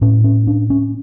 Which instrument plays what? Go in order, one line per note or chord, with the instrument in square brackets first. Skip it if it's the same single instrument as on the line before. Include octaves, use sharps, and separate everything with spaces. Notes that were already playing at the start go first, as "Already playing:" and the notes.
[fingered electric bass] A2 C#4
C#4
D4
C#4